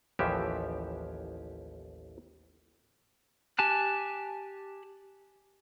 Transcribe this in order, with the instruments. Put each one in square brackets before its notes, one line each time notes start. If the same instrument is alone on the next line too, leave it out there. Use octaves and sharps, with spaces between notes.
[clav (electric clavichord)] A1 D#2 E3 F3 G4 E5
[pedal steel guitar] G4 G#5 A5 F#6